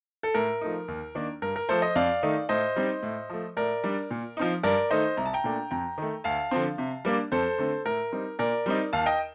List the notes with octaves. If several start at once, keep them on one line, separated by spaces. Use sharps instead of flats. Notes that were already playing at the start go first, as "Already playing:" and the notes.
A4
A2 A#4
F3 A3 D#4
D#2
D#3 A#3 D4
G2 A#4
A#4
F3 A3 A4 C5
C5 D#5
F2 D5 F5
D#3 A3 D#4
A2 C5 D#5
G3 C4 D#4
A2
F3 A3
A2 A#4 D5
G3 D4
A#2
F3 C4 D#4
G2 A#4 D5
D#3 A3 D#4 C5 D#5
C2 A#5
A5
G5 A#5
A#2 A3 D4
F2 G5 A#5
D#3 A3
D2 F5 A5
D3 F3 C4
C3
G3 A#3 D4
F2 A4 C5
D3 A3 C4
A2 A#4
G3 C4 D#4
A#2 A#4 D5
G3 C4 D#4
D#2 F5 A5
D#5 G5